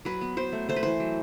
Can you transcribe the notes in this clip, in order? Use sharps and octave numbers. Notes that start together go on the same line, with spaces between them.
F#3 B4
B3
F#3 C5
A3
A3 C5
B4
E3 C5
F#3